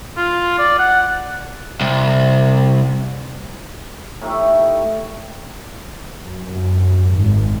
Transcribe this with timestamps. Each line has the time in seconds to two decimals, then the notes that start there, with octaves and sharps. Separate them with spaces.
0.17 F4
0.59 D5
0.79 F#5
1.81 C2
4.22 A2 A3 D#4 G4
6.22 F#2
7.14 G#1